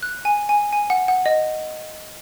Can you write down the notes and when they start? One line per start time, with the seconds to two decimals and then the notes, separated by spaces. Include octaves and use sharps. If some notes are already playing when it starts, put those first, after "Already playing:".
0.03 F#6
0.25 G#5
0.49 G#5
0.73 G#5
0.90 F#5
1.08 F#5
1.26 D#5